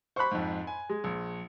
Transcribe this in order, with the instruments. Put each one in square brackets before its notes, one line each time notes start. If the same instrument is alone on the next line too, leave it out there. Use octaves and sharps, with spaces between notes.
[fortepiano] C5 B5 [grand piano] C#6 F#6
[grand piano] F2 G#2
G#5
[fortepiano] G#3
[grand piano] A#1